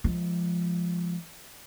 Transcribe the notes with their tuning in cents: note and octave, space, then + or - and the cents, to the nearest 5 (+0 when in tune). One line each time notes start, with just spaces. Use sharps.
F3 -10 G#3 +10